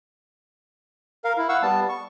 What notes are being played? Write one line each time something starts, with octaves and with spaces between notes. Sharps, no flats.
A#4 F5
E4
F5 F#5 C#6 E6
G3 B3 A5
C#6